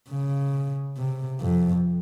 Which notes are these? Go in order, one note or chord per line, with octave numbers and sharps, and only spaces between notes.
C#3
C3
F2